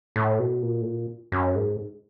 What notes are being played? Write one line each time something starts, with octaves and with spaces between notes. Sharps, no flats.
A2
B2
A#2
A2
A#2
F#2
G#2